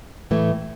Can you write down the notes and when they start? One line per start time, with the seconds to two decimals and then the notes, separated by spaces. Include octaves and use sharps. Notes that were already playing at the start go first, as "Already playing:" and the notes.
0.31 A2 E3 A3